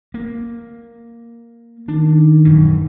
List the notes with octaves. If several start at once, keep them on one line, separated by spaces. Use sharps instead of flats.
A#3
D#3 D4
D#1 F#2 E3